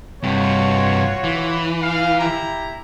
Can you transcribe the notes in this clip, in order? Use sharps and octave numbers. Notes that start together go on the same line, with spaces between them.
G2 C3 F4 F#4 C#5
E3
F5
E4 G4 A#5